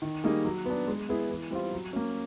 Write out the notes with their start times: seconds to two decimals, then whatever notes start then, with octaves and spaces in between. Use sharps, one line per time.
0.02 D#3
0.24 G3 A#3 D#4 G#4
0.45 F#3
0.65 B3 D4
0.87 G#3
1.09 B3 E4 G#4
1.30 E3
1.51 G3 C4 F4
1.72 F#3
1.93 A#3 C#4